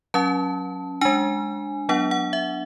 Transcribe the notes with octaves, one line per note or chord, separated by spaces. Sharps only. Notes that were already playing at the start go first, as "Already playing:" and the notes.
F#3 C#4 A5
G#3 D4 G#5
F#3 B3 D4 F#5
F#5
E5